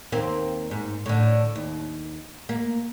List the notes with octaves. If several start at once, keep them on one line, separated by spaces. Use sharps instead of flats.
D#2 A#3 C4
G#2
A2 D3
D#2
A#3